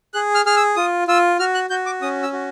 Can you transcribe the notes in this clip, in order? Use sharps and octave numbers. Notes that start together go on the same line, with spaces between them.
G#4 F#6
F6
G#4 F6
E6
F4 D#6
F4 E6
F#4 F6
F#6
F#4 G6
D6
C#4 D#6
E6
F#4